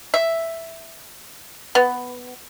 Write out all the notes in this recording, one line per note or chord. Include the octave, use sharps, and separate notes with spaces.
E5
B3